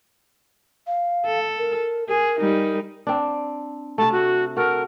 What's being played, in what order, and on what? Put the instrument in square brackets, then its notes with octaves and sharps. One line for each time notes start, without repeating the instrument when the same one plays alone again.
[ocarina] F5
[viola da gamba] A4
[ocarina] A#4
[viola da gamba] G#4 [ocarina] A#4
[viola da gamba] G3 D#4
[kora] C4 D4
[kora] C3 A3 [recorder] A5
[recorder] F#4
[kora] F#4 A4 [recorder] A#4